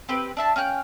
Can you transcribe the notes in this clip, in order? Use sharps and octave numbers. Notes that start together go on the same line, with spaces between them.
C4 G4 B4
D4 E5 A5
C#4 F5 G5 F#6